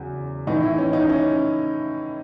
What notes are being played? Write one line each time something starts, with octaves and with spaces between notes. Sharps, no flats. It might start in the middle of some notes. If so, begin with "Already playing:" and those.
Already playing: E2 C#3 F#3
A2 E3 D#4
E4
C#4
D#4
C#4